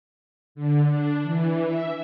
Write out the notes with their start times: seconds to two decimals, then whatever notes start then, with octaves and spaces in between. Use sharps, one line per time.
0.55 D3
0.88 D4
1.23 E3
1.65 E5